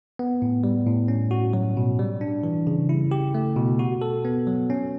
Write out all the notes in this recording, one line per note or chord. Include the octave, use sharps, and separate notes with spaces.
B3
A2
G3
A2
C#4
F#4
F#3
B2
G3
D4
E3
C#3
E4
G4
A3
B2
F#4
A4
B3
F#3
C#4